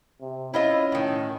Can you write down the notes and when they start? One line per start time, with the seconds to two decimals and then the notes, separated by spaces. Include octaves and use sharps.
0.21 C3
0.54 C#4 E4 F4 D#5
0.92 A2 D#3